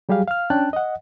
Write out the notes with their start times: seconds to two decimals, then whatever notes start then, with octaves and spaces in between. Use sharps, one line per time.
0.09 F#3 G3 G4 G#4 F5
0.28 F5 F6
0.50 C#4 D4 G5 A5 F#6
0.73 D#5 F#5